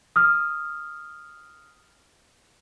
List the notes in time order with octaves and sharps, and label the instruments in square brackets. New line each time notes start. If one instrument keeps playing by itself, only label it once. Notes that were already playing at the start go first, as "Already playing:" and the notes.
[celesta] D#6 F6